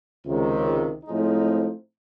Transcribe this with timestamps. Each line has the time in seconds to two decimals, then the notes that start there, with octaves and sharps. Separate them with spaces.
0.25 C#2 C3 D#3
1.04 A2 F3 G#3 C4 D#4